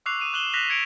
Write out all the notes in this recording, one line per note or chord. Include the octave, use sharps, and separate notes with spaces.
C#6 D6 E6 F#6 C7 F7
D6 D#6 D#7 E7
D6 F#6 E7 F#7 G7
F#6 A#6 B6 F7 F#7
G#6 C#7 D7 F7